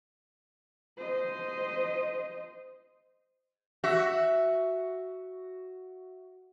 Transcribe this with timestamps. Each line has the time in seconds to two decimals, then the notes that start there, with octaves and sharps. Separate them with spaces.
0.98 C5 D#5
3.84 F#4 E5